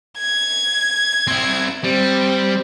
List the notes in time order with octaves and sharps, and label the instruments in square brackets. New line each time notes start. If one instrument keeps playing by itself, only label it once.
[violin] G#6
[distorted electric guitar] C4 E4
[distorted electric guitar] G3 [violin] C4